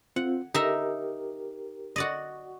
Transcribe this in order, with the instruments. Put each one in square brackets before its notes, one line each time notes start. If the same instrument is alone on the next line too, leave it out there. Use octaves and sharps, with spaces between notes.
[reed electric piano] C4 F4 [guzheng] F#5
[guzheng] D#4 E5 A#5 [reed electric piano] G4 A#4
[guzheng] F#4 D5 D#5